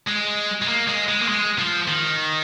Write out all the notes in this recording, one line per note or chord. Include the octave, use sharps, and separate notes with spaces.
G#3
G#3
A#3
G#3
G#3
A#3
G#3
F3
D#3